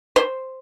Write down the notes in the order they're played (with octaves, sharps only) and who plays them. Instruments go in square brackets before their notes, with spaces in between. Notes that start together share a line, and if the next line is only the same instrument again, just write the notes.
[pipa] C5